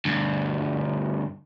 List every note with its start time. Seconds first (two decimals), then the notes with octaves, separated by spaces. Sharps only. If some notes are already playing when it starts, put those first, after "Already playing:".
0.05 D2 G2